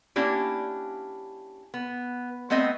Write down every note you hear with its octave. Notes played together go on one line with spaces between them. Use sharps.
A#3 C#4 D4 E4 G4
B3
A3 B3 C4 D#5 E5